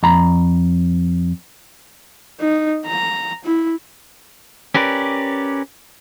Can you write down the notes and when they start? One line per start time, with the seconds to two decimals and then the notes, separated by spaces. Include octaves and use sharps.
0.03 F2 A#5 B5
2.40 D#4
2.86 A#5
3.45 E4
4.75 C#4 G4 A#4 B4 D5